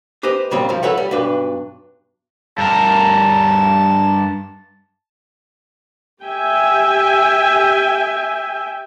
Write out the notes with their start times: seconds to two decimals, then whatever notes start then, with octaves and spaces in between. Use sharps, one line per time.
0.23 G4 B4 C5 D#5
0.51 A#2 C#3 G3 C4 C#5 D#5
0.69 G2 C3 F3
0.83 A4 B4 C#5 E5 F#5
0.98 G3
1.11 B1 G2 D4 B4
2.58 G2 A#4 A5
6.23 G4 E5 G5 G#5